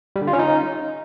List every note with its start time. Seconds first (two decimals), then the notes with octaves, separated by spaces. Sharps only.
0.16 G3
0.21 D3
0.27 F4
0.33 C#4
0.39 D#4